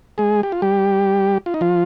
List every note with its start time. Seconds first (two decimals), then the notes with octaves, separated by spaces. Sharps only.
0.18 G#3 G#4
0.43 G4
0.52 F4
0.62 G3 G4
1.46 F4
1.54 D#4
1.61 F3 F4